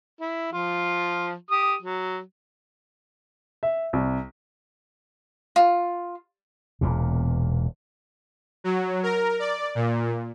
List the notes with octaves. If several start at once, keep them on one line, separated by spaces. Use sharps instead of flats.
E4
F3 F4
G4 D#6
F#3
E5
C2
F4
E1 E2 A#2
F#3
A#4
D5
A#2